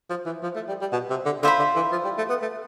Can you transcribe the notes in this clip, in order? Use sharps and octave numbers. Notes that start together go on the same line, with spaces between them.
F3
E3
F3
A3
G3
G3
B2
C3
D3
D3 F4 C5 E5 B5
D3
E3
F3
G3
A3
B3
A3